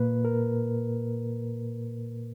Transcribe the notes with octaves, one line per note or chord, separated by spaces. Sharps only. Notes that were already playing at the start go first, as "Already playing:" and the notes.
Already playing: A#2 A#3 B4
A#4